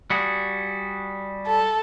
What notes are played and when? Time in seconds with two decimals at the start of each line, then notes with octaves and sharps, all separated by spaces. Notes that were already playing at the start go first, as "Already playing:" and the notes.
0.10 G3 F#4 G#4
1.46 A4